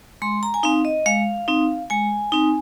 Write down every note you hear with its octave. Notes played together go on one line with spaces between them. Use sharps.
G#3 C6
A#5
G#5
C4 D#4 F5
D#5
G#3 F5
C4 D#4
G#3 G#5
C4 D#4